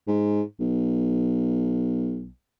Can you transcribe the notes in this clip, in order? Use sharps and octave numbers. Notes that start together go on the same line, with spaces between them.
G#2
B1